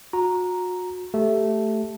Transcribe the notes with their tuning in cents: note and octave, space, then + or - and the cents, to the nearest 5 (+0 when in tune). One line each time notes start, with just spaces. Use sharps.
F#4 -35 A#5 +0
A3 +0 G4 +0